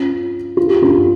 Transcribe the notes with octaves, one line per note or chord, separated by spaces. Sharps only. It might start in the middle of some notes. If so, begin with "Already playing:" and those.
Already playing: C#4 F4
F4
G4
C#4 F4